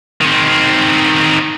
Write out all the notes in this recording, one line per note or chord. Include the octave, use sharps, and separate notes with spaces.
D#3 C4